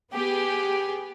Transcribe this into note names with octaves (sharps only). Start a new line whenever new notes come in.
B3 G4 G#4